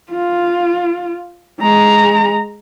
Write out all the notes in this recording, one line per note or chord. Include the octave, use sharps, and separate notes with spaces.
F4
G#3 A#5